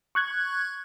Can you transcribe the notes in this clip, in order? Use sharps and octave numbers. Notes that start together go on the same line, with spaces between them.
C#6 F#6 G#6